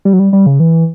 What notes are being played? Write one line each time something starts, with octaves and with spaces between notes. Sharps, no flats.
G3
F#3
G3
G3
C#3
E3